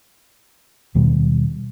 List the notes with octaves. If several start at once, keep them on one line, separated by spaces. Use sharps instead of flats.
D#2 B2 D#3 G3